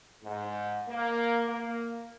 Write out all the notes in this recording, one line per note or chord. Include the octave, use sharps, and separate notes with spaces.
G#2
A#3
A#3